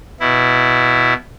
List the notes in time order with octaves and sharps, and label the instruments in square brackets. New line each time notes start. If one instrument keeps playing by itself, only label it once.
[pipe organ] B2 E4